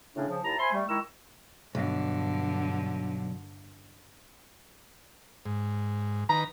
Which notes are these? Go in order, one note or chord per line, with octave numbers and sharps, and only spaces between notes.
A2 C#3 C#4 D4
C#3 F3
D#2 E4 A5 A#5
C5 E5 G#5 B5 C6
G3 A3
D#3 G#3 E4 A#5 C#6 E6
B1 G2 D3
G#2
D#3 B4 A#5